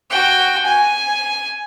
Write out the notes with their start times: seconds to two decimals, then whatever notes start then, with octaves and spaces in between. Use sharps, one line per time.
0.10 F#4 G5
0.65 G#5